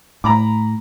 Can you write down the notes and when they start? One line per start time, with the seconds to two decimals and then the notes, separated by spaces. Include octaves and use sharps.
0.24 A2 A#5 B5 D6